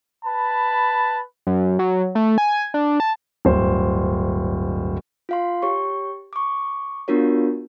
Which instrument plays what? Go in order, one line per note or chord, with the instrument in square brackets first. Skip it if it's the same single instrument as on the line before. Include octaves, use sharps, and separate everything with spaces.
[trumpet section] B4 A5 B5
[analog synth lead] F#2
F#3
A3
G#5
D4
A5
[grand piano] D1 G1 C5
[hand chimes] F4 F5 C6
G4 C#5 C#6
C#6 D6
B3 D4 F4 F#4 A#4 C#5